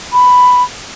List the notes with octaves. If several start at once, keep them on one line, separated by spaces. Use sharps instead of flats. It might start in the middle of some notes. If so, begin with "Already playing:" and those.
B5